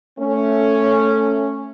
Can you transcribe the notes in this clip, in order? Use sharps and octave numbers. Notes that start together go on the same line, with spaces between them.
A3 C#4